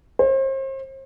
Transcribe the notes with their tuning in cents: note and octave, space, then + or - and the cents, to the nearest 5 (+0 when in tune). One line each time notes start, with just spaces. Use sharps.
C5 +40